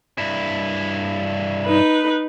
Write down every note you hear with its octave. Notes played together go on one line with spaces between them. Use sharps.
G2 E4
D#4 B4